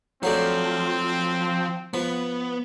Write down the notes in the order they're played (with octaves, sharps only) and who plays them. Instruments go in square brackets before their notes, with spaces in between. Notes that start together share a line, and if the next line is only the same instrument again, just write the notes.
[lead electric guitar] F3 [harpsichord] F#3 A3 D4 [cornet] C4
[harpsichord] F3 [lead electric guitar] B3